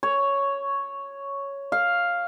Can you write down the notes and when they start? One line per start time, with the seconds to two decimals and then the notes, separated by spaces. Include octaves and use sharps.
0.03 C#5
1.72 F5